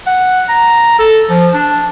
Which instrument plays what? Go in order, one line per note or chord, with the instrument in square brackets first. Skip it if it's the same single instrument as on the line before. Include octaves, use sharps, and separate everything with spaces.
[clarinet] F#5
A#5
A4
F3
D4